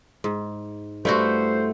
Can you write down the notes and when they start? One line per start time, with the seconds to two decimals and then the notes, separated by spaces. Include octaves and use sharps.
0.24 G#2
1.05 G2 A3 E4 F#4 C5